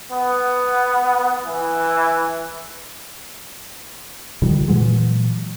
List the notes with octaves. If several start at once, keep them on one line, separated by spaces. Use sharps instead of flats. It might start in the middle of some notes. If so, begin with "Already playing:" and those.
B3
E3
D3 D#3 F3 G3
A#2 E3 F#3 G#3